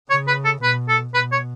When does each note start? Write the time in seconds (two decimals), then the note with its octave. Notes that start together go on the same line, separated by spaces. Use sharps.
0.10 C#3 C#5
0.27 B4
0.45 A4
0.63 B2 B4
0.89 A4
1.14 B2 B4
1.32 C#5